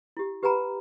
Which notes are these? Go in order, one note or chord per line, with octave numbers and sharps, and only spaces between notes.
E4 G4
G4 B4 F#5 G#5 A#5 B5